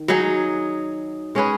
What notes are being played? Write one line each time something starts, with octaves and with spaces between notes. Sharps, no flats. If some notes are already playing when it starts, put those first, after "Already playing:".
Already playing: D#3
F#3 D#4 G#4
G#3 C#4 G#4 B4